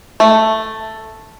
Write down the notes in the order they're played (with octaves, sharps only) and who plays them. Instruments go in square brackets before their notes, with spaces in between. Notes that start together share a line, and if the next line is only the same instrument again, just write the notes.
[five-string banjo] A3